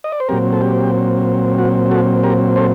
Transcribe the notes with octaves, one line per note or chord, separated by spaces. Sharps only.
D#5
D5
C5
A#2 F#3 C4 G4 A#4
A4
G4
F#4
F#4 A4
G4 A#4
A4 C5